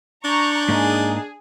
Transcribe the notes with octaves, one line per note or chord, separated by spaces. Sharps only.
D4 A#5 C#6 G6
G#2 A#3 D#4 G#4